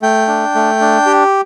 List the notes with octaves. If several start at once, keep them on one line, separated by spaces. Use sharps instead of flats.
A3 G5
D4
A3
D4
G4